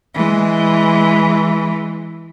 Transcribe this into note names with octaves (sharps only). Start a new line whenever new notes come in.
E3 G#3